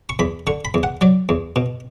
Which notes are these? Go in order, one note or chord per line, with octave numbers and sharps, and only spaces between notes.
C#6
E2 B5
D3 C#6
B5
E2
F#5
F#3 D5
E2
B2